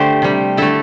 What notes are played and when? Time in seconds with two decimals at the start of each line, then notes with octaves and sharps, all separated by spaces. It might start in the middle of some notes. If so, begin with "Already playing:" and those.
Already playing: D3 A3 G4 C5
0.22 C3 G3
0.57 D3 A3 E4 A4